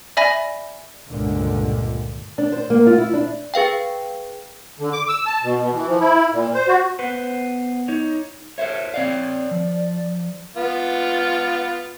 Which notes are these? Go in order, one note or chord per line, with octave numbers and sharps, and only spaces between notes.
D5 E5 G#5 B5 A#6
C#2 G2 A#2 D3
D4
C5
A#3
F4
E4
D4
G#4 B4 F5 G5
D3
D6
E6
A5
B2
B2
E3
F3
E4
A#2
C5
F#4
B3 B4 C5 F#5
D#4 C#5
A4 C5 C#5 E5
C4 C#5 D5 F5
F3
B3 F4